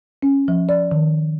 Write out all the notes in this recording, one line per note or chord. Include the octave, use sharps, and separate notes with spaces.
C#4
F3
D5
D#3